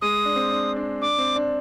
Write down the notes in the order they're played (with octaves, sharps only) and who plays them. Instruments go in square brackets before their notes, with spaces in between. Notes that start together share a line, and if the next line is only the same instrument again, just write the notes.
[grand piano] G#3 [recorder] D#6
[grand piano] D4
C4
D4
D4
[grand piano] D4 [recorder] D6
[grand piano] C4
D4